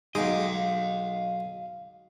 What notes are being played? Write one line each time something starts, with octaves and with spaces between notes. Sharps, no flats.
B1 G#3 D#4 D#5 F5 D6